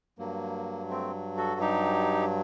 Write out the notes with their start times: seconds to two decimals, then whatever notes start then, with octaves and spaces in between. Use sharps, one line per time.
0.18 G2 F#3 A#3
0.89 A3 C4
1.37 F#4 A4
1.60 D#4 G4